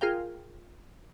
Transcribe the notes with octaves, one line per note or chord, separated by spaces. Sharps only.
F4 G#4 A#4 F5 G5